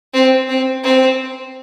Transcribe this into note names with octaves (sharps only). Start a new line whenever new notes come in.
C4
C4
C4